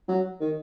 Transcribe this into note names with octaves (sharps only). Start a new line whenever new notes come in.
F#3
D#3